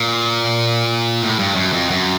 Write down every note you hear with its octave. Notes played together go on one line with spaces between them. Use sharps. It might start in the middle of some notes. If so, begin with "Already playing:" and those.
Already playing: A#2
A2
G2
F#2
F2
F#2